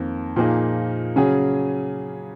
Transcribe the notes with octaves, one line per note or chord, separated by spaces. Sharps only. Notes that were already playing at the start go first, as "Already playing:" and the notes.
Already playing: F2 D#3 A#3
A#2 F3 A#3 D#4 G#4
C#3 F#3 C#4 G#4